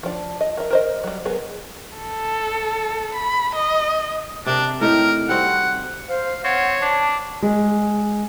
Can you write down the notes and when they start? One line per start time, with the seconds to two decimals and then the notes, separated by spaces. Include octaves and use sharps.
0.03 F3 D4
0.41 D#5
0.57 A#4 E5
0.71 A#4 C5 D#5
1.04 F#3 G3
1.25 F#3 B3 G#4 A#4
1.98 A4
3.14 B5
3.55 D#5
4.46 C3 D4 A#4
4.81 A2 D#4 G4 A#4
5.29 G3 C4 F#4 F#5
6.09 C5 F5
6.44 C4 C#5 F#5
6.82 D4 A5
7.42 G#3